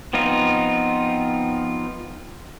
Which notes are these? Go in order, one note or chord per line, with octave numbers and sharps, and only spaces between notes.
F3 B3 C4 D#4 F4